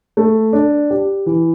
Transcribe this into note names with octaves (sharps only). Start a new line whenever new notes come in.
A3
D4
G4
E3